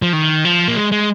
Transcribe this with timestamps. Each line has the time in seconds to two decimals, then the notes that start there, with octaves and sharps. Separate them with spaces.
0.02 F3
0.13 D#3
0.45 F3
0.68 A#3
0.76 G#3
0.92 G#3